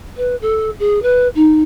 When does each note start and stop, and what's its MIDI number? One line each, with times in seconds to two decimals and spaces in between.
0.17 0.35 71
0.41 0.70 69
0.79 1.01 68
1.02 1.28 71
1.35 1.62 63